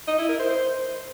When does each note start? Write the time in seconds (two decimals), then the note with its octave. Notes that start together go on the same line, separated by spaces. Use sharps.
0.08 D#5
0.18 E4
0.29 A#4
0.39 C5
0.50 C5